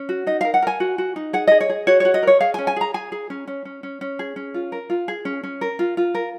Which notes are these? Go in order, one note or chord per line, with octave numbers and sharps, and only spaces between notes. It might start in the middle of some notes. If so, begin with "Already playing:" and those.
Already playing: C#4
F#4
D#4 D#5
A#4 F5
F#5
A#4 G#5
F#4
F#4
D#4
G#4 F#5
G#4 D#5
C#5
G#4
F#4 C#5
C#5
F#4
D#5
A#4 C#5
G#4 F5
G#5
C#4
G#5
G#4 A#5
G#4 G#5
G#4
C#4
C#4
C#4
C#4
C#4
G#4
C#4
F4
A#4
F4
G#4
C#4
C#4
A#4
F4
F4
A#4